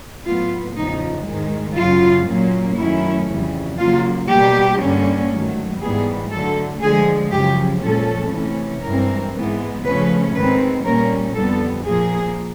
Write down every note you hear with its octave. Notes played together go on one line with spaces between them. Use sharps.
A2 F#3 B3 F4
E2 C#3 F3 D#4
G#2 D#3 G#3
F#2 C#3 F#3 F4
A#2 F#3 A#3 C#4
F#2 D#3 F#3 A3 C#4 E4
F2 C#3 E3 G3
C#3 F#3 A#3 F4
B2 G3 A#3 G4
G2 D3 G3 A#3 C#4
G#2 D#3 F#3 A3
G#2 E3 G3 B3 G#4
D3 F#3 A3 A4
D3 F3 G#3 G#4
F#2 C#3 F3 G4
A#2 F3 G#3 C#4 A4
C3 E3 A3 C#4
G2 E3 G#3 C4 A#4
G#2 E3 G#3 B3
C#3 F3 A3 C#4 B4
G#2 D#3 G#3 C4 B4
A#2 G3 A#3 C#4 A#4
F2 D3 G3 B3 A4
A#2 F3 A#3 G#4